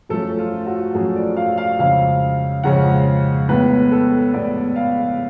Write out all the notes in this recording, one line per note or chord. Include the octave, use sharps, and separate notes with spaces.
F#2 F3 A3 C#4 A4
F4
F#4
F#2 F3 A3 C#4 G#4
D5
F5
F5
F2 C#3 G#3 C#4 F5
F2 C#3 G#3 C#4 F#5
A2 G#3 B3 B4
A4
A2 G#3 B3 D5
F5